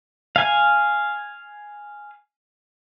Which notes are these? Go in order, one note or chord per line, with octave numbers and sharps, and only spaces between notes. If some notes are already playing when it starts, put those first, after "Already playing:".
F5 G#5